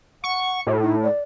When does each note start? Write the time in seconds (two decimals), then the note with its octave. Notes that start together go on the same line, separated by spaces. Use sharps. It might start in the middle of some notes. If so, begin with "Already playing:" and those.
0.24 F#5 C#6
0.67 A2 F#4
0.82 D#4
1.03 D5